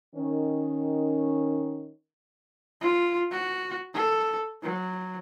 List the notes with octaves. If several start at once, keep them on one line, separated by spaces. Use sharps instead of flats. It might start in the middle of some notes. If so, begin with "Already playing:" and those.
D#3 C#4
F4
F#4
A4
F#3